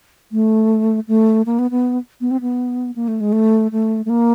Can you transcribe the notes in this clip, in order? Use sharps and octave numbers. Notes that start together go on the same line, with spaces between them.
A3
A3
A#3
B3
B3
B3
C4
B3
A#3
A3
G#3
A3
A3
A3
A#3